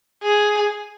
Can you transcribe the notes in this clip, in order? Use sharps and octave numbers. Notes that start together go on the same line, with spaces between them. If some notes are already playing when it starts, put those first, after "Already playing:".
G#4